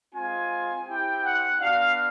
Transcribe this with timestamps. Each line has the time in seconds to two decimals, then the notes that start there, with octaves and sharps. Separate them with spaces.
0.14 G#3 C4 F4 G#5
0.87 C4 E4 G4 G5
1.24 F#5
1.60 B3 D4 F#4 F5